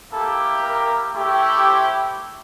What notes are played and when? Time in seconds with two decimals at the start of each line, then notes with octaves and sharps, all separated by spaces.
0.11 A#3 E4 G4 A4
0.63 A#4
1.14 A3 E4 G4
1.65 C5